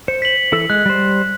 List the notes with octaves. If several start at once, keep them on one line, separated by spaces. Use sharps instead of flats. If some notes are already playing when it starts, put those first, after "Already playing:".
C5 C#7
B6 F#7
E3 A4 E6
G#3 F#6
G3 C5